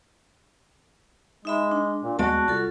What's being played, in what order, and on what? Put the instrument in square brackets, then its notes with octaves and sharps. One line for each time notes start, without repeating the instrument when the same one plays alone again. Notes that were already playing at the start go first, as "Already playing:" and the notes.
[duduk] G#3 [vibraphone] D#4 E5 B5
[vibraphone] D4
[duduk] A#2
[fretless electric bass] D#2 G#3 B3 [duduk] F#4 [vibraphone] D5 A5
[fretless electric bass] C2 [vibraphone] F4 A4